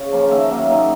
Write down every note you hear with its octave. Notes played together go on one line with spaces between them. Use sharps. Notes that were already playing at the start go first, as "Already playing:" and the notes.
Already playing: C#3
F3 A#3 C#4
D#3 E5
F#3 A#3
D#3 D#5